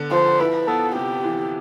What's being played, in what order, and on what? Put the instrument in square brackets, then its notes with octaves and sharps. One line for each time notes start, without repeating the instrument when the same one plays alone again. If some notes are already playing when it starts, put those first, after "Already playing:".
Already playing: [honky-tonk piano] D3 B3
[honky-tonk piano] F3 [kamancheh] C5
[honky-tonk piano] E4 [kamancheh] B4
[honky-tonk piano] B3 [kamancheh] A4
[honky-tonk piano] C3 [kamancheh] G4
[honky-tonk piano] E3